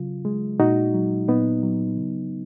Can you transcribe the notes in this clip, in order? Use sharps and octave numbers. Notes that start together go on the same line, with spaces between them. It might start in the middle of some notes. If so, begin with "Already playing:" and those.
Already playing: C#3 F#3 F4
G#3
A#2 D#4 F#4
F#3
A#2 B3 D#4
F#3
C#3